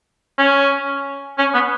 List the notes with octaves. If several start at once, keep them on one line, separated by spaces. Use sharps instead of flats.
C#4
C#4
B3